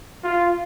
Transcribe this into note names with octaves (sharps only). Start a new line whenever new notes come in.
F4